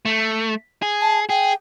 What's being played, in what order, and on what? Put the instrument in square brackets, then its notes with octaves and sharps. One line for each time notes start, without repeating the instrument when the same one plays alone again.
[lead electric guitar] A3
G#4
[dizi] A5
[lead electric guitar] G#4 [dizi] G5